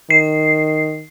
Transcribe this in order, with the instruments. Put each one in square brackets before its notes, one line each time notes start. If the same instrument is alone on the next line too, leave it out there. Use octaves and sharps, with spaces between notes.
[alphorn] D#3 [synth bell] C7